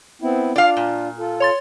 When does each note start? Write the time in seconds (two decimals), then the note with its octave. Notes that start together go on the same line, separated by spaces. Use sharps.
0.22 B3 C4 E4
0.56 D4 F4 D5 F5
0.77 A#2
1.19 F4 A4
1.40 C#5 C6 A6